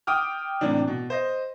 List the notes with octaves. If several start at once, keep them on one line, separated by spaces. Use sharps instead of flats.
G5 D6 D#6 F6
A2 C3 E3 D4
B2
C5 D#5